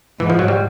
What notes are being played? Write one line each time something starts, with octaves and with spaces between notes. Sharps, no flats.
G#2 E3
F3
F#3
G3